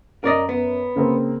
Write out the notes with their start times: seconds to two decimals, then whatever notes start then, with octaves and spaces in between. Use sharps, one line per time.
0.24 F#2 A#4 D5 D#5
0.49 B3
0.96 C#3 A#3 C4